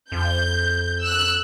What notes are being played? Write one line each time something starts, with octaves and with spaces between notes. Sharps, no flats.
F2 G6
E6 F#6